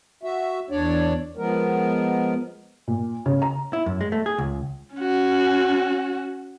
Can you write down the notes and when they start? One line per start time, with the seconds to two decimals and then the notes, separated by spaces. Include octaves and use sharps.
0.23 F#4 E5
0.70 E2 D4 C#5 D5
1.37 F3 G#3 B3 A#4
2.88 A#2
3.26 C#3
3.42 A#5
3.73 E4
3.86 F#2
4.01 G#3
4.12 A3
4.26 G#4
4.38 C#2
4.95 C#4 F#4